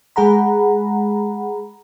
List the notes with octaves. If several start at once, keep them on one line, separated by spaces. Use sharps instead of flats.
G#3 G#4 F#5 A#5 B5